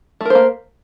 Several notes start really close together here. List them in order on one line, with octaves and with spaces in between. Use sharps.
A3 A#4 C5 A#3